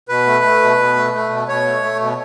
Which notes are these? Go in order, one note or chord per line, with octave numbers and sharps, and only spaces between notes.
B2 B4
A3
A3
B2
B2
A3
A3
B2
B2 C#5
A3
A3
B2